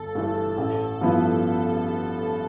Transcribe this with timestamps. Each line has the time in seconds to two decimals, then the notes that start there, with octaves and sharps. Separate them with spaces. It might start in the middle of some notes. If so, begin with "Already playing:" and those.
Already playing: G1 A4
0.15 G2 E3 A3
0.57 A1
1.01 G2 F3 B3 E4